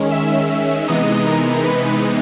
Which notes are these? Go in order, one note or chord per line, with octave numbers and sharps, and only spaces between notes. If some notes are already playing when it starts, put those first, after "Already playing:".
Already playing: D#3 G#3 C#4
E5 E6
E5 E6
C3 E3 G#3 B3 D#4 D#5 D#6
A#4 A#5
B4 B5